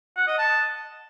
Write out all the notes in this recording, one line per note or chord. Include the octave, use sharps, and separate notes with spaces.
F#5
D#5
A5